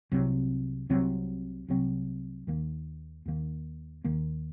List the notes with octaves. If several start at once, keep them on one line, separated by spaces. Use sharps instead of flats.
C2 C3 F#3 C4
C2 C3 F#3 C4
C2 C3 F#3 C4
D#2 D#3 A#3
D#2 D#3 A#3
D#2 D#3 A#3